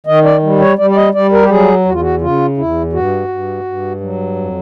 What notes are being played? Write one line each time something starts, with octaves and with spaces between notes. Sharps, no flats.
D#3 D#5
D5
G3
C#5
G3 D5
D5
D#5
G3 D5
A#4
G4
F#3 G#4
E2 F#4
F4
F#4
C#3 F4
E2 E4
G2 F#4
G2
G2
F#3
F2